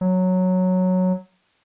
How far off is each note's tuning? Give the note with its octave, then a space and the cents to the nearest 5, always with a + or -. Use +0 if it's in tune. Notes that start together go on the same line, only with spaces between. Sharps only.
F#3 -5